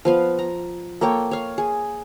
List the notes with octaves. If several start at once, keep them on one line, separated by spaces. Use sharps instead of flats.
F3 B3 F5
A#5
A#3 A4 C#5 G5
C#5 F5
G#4